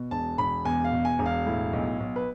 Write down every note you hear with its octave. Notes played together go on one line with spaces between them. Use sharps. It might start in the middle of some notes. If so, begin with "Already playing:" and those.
Already playing: B2
E1 A5
E1 B5
E2 G#5
F5
B2
G#5
E1
F5
A2
B1
B1
B4